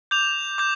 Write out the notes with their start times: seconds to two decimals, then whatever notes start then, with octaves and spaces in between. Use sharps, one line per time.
0.11 D6 G6 F7
0.58 D6 G6